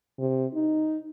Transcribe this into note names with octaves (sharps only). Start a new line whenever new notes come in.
C3
D#4